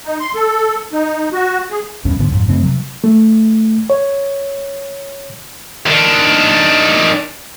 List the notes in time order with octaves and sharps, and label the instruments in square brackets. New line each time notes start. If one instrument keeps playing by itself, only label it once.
[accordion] D#4
C6
A4
D#4
F#4
G#4
[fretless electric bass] E2 G2 B2 C#4
D2 G#2 D3 B3
F2 G#2
F#2 C#3 A3 C4
C3 F#3
[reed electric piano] A3
C#5
[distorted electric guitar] D#3 D4